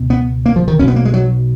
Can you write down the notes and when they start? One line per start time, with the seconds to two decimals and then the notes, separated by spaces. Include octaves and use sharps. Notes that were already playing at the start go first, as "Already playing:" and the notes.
Already playing: C#2 B2
0.10 B3
0.46 A#3
0.56 F3
0.68 D#3
0.79 B1 B2 C#4
0.88 B3
0.96 A#3
1.05 G#3
1.14 F#3